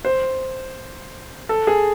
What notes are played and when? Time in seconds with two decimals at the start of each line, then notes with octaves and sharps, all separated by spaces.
0.05 C5
1.49 A4
1.67 G#4